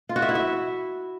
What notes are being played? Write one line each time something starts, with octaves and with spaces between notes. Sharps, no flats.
F4
F#4
E5
E4
E5